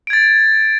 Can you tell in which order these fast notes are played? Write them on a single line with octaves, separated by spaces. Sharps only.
D7 G#6 A6